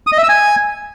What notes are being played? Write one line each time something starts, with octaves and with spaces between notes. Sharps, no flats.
D#6
D#5
E5
E6
G#5